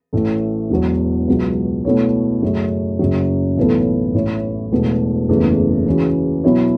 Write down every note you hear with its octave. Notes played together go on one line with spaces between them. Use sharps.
A1 A2 A3
E1 E2 B2 F#3 B3
C#2 B2 F#3
B2 A3 E4 A4 C#5
F#2 C#3 F#3 A3 F#4
F#1 F#2 C#3 F#3
B1 A2 E3 B3 A4
A1 A2 A3 E4 C#5
E1 E2 B2 A3
F#1 E2 C#3 A3
C#3 E3 C#4 F#4
B2 F#3 B3 E4 C#5